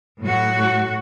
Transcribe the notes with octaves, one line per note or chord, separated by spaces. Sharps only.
A2 F#3 F#4